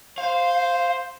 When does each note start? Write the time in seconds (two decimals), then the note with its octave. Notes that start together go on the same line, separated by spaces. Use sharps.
0.18 C5 F5